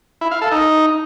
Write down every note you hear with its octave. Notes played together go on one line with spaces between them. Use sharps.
E4
F5
A4
D#4